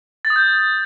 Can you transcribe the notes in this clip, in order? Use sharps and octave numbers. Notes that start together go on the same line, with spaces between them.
A6
D#6
G6